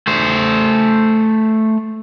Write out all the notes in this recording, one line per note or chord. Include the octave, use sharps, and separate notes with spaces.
A3 C5